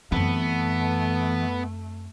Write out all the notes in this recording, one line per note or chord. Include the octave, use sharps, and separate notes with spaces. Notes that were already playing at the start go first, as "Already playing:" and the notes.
F#2 E3 A3 B3 C4